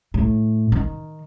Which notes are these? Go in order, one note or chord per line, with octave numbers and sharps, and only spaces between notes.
A2
D#3